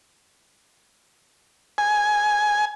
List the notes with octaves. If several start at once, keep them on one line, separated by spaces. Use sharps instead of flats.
G#5